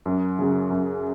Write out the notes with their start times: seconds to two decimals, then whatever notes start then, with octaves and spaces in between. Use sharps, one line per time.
0.06 F#2
0.39 C#3 F#3
0.70 F#2